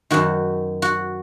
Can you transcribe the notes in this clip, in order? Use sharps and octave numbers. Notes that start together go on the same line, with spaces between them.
F#2 D#3 F#4
F#4